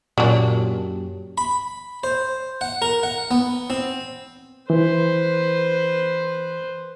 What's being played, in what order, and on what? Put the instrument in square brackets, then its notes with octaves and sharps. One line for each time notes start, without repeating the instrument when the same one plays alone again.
[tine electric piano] F#2 F#3 G4 [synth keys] A#2 [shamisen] C#4 D4
[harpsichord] B5
C5
F#5
A#4
F#5
B3
C4
[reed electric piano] E3 [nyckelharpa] B4 C5